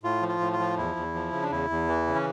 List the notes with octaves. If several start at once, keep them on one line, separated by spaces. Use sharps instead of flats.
A2 F4
F3
F4
A2
F4
F3
E2 E4
E2
F3
C#3
D4
E2 E4
E2
E3
C#3
C#4